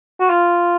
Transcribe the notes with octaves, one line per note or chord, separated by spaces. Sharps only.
F#4
F4